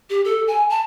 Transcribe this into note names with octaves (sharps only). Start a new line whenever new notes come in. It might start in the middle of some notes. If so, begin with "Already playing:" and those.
G4
A4
G#5
A5